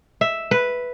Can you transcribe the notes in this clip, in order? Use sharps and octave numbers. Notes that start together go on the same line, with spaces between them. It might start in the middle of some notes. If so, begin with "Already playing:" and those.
E5
B4